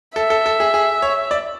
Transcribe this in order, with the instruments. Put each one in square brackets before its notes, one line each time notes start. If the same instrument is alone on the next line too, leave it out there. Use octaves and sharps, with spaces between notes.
[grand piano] A4 [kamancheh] E5
[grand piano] A4
A4
G#4
G#4
C#5
D5